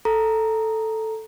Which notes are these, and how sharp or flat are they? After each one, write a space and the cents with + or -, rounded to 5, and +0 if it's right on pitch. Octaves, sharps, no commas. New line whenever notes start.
A4 +0 A#5 +0